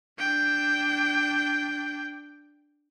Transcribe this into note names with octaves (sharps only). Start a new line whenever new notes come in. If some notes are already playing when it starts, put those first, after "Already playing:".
D4 G5